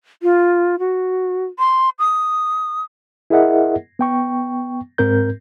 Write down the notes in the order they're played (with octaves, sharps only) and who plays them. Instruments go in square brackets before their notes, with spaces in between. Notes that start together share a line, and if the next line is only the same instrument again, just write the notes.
[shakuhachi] F4
F#4
C6
D#6
[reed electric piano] E4 G#4 A#4 D#5 E5 F#5
B3 G5 C#6
G#2 C4 A#4 G6